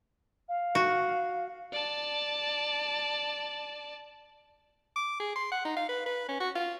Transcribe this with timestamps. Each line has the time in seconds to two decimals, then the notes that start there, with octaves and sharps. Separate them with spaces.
0.49 F5
0.75 F#4
1.72 D5 A5
4.96 D6
5.20 G#4
5.36 C6
5.52 F#5
5.65 D#4
5.77 F5
5.89 B4
6.06 B4
6.29 C#4
6.40 F#4
6.55 F4